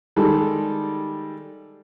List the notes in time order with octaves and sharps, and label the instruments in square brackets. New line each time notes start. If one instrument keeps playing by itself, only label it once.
[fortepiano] D#3 G3 G#3 A4